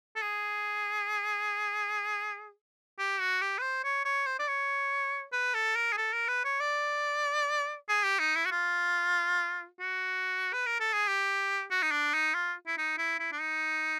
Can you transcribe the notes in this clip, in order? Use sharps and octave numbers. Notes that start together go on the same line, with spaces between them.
A4
G#4
G4
F#4
G4
B4
C5
C#5
C#5
C5
D5
C#5
B4
A4
A#4
G#4
A4
A#4
B4
C#5
D5
G#4
G4
D#4
E4
F#4
F4
F#4
B4
A#4
A4
G#4
G4
F#4
D#4
D4
D#4
F4
E4
D#4
E4
E4
D4
D#4